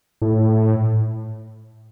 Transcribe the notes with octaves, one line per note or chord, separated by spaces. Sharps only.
A2